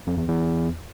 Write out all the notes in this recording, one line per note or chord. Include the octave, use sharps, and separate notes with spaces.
F2
E2
E2